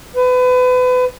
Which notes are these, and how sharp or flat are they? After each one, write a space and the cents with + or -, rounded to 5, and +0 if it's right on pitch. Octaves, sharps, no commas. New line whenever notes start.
B4 +30